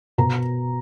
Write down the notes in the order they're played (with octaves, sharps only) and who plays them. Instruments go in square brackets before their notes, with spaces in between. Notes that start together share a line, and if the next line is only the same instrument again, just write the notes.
[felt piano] B2 A#5